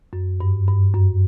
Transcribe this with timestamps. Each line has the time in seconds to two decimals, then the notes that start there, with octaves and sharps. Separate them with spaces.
0.13 F#2
0.40 G2
0.68 G2
0.94 F#2